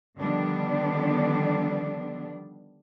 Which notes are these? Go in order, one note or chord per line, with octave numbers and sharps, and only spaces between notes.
D3 D#3 F3 G3 B3 D4